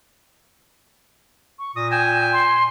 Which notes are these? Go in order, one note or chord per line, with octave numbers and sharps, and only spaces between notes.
C#6
A#2 D#6 A#6
G5 G#5 E7
C6